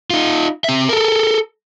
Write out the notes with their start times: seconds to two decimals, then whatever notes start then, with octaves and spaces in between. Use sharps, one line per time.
0.10 D#4 F4
0.64 C4 E5
0.89 A4 A#4